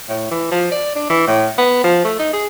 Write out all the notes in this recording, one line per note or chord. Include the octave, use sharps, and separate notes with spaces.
A2
E3
F3
D5
D4
E3
A2
B3
F3
A3
D#4
G#4